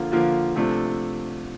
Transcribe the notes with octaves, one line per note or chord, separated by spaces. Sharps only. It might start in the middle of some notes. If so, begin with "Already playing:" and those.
Already playing: D3 F3 A#3 F4
D3 F3 A#3 F4
C3 F3 A3 D4